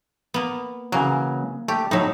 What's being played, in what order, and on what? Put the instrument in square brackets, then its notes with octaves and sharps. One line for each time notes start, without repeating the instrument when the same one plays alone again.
[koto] A#3 B3
[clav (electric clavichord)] C#3 E3 F#3 [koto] A#3
[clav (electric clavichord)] A3 [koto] G4
[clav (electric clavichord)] A2 E5 [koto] F#3 D#4